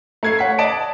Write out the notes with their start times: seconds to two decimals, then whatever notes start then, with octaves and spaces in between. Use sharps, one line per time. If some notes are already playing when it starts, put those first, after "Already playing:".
0.23 A3 G#6 C7
0.39 C#5 F#5 B6
0.59 D5 D#5 A5 D7